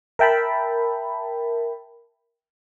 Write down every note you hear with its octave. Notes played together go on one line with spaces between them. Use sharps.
A#4 E5 G5 A5 B5